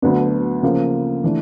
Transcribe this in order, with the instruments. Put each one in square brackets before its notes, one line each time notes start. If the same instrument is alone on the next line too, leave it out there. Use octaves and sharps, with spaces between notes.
[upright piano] D2 D3 F#3 B3 D4
C#3 F3 A#3
E3 A3 D4